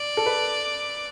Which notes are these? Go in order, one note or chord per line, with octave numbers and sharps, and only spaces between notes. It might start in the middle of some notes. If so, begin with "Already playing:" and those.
Already playing: D5
A4
B4